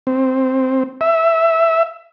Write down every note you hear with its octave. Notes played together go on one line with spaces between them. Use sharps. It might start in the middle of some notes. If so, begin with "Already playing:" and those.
C4
E5